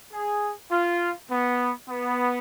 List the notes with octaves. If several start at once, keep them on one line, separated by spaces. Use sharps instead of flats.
G#4
F4
B3
B3